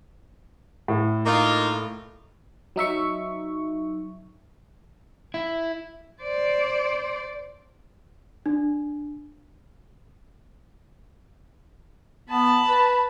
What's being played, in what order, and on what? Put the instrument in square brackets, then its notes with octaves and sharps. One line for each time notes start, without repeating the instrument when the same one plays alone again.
[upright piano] A2
[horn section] A#3 D#4 F4
[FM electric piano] F#3 D#4 E5 C#6
[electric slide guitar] E4
[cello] C5 D5
[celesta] D4
[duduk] B3 [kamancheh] A5 B5
[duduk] B4